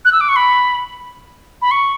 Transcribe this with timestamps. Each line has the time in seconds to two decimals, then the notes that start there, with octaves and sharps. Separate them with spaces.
0.05 F#6
0.12 E6
0.20 D6
0.29 C#6
0.36 B5
1.62 B5
1.71 C#6